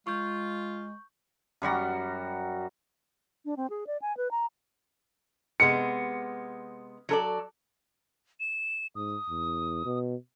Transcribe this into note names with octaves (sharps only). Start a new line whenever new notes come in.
G#3 F4 C#6 G6
F#2 G3 F#4 A#5
D4
C4
G#4
D5
G#5
B4
A#5
C3 G#3 B3 C#7
F#3 A4 D5
E7
G#2 D#6
E2
B2